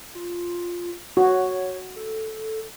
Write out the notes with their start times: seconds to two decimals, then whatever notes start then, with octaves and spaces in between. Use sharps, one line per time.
0.15 F4
1.17 F#4 C#5
1.96 A4